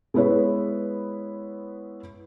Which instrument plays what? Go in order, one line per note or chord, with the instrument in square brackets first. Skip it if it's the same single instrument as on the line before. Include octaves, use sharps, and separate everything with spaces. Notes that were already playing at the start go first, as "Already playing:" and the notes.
[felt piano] G#3 B3 E4 B4 C#5